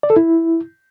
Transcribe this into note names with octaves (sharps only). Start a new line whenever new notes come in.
D5
A4
E4